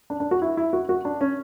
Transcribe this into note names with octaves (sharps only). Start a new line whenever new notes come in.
D4
D4
F#4
E4
E4
F#4
F#4
D4
C#4